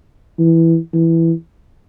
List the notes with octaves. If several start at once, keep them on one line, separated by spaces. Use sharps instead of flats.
E3
E3